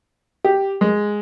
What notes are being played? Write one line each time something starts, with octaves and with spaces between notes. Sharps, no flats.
G4
G#3